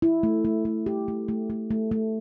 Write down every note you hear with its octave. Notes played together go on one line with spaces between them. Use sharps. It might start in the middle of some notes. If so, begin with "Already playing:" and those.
E4
A3
A3
A3
G4
A3
A3
A3
A3
A3